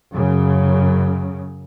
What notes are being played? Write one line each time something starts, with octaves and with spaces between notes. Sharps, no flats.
F#2 C#3